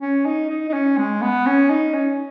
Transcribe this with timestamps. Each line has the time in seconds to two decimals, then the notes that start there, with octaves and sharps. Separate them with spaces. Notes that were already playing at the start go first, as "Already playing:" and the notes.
0.02 C#4
0.26 D#4
0.50 D#4
0.69 D#4
0.73 C#4
0.98 G#3
1.22 B3
1.46 C#4
1.70 D#4
1.94 C#4